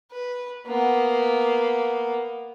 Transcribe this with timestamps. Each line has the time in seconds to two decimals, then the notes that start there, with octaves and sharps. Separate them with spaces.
0.11 B4
0.66 A#3 B3